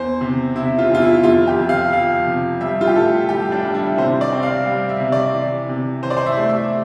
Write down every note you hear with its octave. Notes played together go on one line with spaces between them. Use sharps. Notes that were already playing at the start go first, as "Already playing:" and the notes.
Already playing: E2 C5
C3
C3 E4
F4
E2
F4
E4
F2 F4
G4
F2
F5
F3 F5
C3
G3 E5
F4
G4
A2 A4
G3 G4
D4
G3
E4
C3 C5
D5
C4
F5
G3
E5
C3
D5
E3
C3
E3 C5
D5
C5
E5
A3
E5